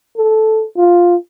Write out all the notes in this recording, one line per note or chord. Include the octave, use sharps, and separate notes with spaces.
A4
F4